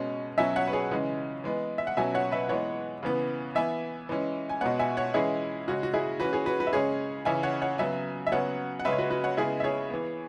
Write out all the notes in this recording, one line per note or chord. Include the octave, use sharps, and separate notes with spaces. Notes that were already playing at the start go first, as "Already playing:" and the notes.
Already playing: B2 G#3 C#4
B2 F#3 C#4 E5 G#5
C#5 F#5
B4
G#4 C#5
C#3 E3 G#3 C#4
E3 G#3 B3
E5
F#5
B2 F#3 C#4 E5 G#5
C#5 F#5
B4 E5
E3 G#3 B3 C#5 F#5
C#3 E3 B3
E3 B3 E5 G#5
E3 G#3 C#4
G#5
B2 G#3 B3 C#5 F#5
E5 G#5
C#5 F#5
E3 G#3 C#4 E4 G#4
C#3 G#3 C#4 F#4
F#4
E4 G#4
E3 C#4 F#4 B4
G#4 C#5
F#4 B4
F#4 B4
E5
C#3 G#3 C#4 G#4 C#5
C#3 E3 C#4 E5 G#5
C#5 F#5
C#5 F#5
C#3 F#3 B3 E5 G#5
E5
C#3 F#3 B3 C#5 F#5
F#5
C#3 G#3 C#4 B4 E5
C#5
F#4 B4
F#4 B4
C#5 F#5
C#3 G#3 B3 E4 G#4
E5
G#4 C#5
E3 B3